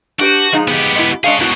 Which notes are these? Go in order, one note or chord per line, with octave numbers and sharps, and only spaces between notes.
D4 F#4 G4 B4
F3 G#3 D#4
B3 G4
G#3 E4
G#3 D4 G#4 C#5 F5
C#2 B2 E4 F#4